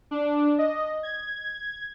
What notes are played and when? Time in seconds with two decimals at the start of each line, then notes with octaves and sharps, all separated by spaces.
0.11 D4
0.59 D#5
1.03 G#6